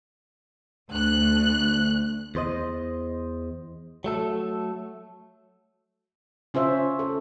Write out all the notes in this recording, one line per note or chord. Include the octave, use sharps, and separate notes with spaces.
D2 F#6
E2 C5 D#5
F#3 A3 A4
C#3 C#4 F4 C5 E5
A4